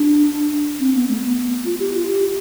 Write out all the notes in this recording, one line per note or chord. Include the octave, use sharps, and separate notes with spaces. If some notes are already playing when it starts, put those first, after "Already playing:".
Already playing: D4
C4
B3
A3
B3
F4
G4
F4
G4